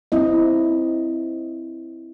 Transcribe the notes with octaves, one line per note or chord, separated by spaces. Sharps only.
C4 E4 D#5